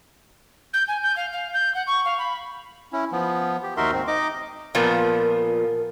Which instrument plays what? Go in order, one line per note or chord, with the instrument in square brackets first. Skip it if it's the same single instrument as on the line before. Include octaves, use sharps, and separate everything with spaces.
[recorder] G6
G#5
G6
F5
F5
G6
F#5
C#6
F5
B5
[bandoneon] C#4 E4
F3 B3
G4
D#2 D#4 F#4 A#4 E5 C6
G#2 C4
D#4 D#5 D6
[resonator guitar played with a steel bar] A#2 F3 B3 [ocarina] A#4